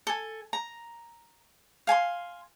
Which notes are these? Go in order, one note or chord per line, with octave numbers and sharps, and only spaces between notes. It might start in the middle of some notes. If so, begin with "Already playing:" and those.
A4 G#5
A#5
F5 G#5 A5 C6